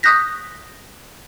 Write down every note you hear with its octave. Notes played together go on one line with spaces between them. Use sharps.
C#6 D#6 F#6 G6 A#6 B6